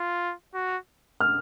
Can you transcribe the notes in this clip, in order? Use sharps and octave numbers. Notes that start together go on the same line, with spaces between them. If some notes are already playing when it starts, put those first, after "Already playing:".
Already playing: F4
F#4
F6